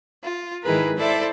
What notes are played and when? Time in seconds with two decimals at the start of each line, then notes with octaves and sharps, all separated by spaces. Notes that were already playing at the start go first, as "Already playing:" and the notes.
0.22 F4
0.63 G#2 D#3 E4 G#4 A#4 B4
0.97 E4 A4 C5 D5 E5